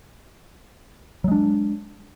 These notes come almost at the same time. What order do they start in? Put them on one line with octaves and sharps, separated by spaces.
F#3 G#3 D4